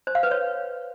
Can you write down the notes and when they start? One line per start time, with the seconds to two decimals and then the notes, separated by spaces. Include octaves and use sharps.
0.07 C5
0.15 F5
0.23 B4
0.31 C#5